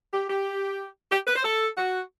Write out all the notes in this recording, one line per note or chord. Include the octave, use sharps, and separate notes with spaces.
G4
G4
G4
B4
C5
A4
F#4